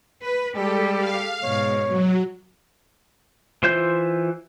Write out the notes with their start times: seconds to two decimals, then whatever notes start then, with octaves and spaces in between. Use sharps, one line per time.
0.25 B4
0.56 G3 G#3 G4 A4
0.97 F5
1.43 G#2 B2 C#5
1.88 F#3
3.63 E3 F4 C5 E5 G6